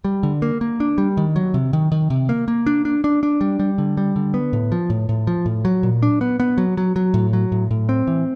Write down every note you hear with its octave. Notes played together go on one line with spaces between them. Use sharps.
G3
D3
A#3
A#3
D4
G3
D#3
F#3
C3
D#3
D#3
C3
A#3
A#3
D4
D4
D4
D4
G3
G3
D3
G3
D3
B3
A2
F3
A2
A2
F3
A2
F#3
A#2
D4
B3
B3
F#3
F#3
F#3
A2
F#3
A2
A2
C4
E3